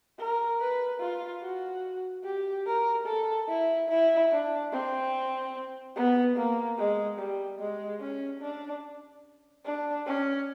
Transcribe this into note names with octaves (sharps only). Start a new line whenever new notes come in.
A#4
B4
F4
F#4
G4
A#4
A4
E4
E4
D4
C4
B3
A#3
G#3
G3
G#3
C#4
D4
D4
C#4